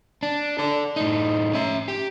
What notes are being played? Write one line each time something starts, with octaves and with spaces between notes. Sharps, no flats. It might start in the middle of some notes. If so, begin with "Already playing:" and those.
D4
A4 D5
A2 D#4
C#4 E5
G4